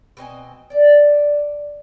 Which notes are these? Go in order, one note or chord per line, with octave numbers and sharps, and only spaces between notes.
B2 C4 D#5 G#5
D4 D5